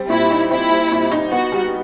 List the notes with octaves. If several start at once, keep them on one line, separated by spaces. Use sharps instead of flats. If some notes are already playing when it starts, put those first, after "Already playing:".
Already playing: G3 C4
A#2 E4
D#4
C4 E4
G3
A#2
D#4
B3 F#4
G3